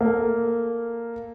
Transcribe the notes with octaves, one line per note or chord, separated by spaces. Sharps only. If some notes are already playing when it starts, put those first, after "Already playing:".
A#3 A4